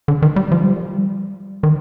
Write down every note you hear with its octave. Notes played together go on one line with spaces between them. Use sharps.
D3
D#3
G3
F3
G3
D#3